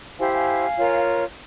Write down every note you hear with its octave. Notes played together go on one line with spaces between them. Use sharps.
E4 G4 C5 F5 G#5
F5 G#5
F4 A#4 C#5